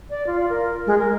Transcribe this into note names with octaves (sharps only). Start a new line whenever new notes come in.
D5
F4
A#4
G#3
A#4